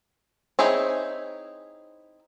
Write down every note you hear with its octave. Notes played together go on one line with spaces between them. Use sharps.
C4 D#4 E4 G#4 C#5